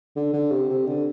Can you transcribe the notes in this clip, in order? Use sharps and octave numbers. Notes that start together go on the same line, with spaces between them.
D3
D3
C3
C3
D3